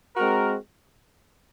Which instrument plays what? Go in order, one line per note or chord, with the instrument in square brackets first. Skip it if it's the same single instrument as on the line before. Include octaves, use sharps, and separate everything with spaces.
[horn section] G#3 C4 F#4 A#4